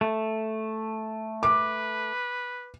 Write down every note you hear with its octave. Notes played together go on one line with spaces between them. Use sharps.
A3
B4 D6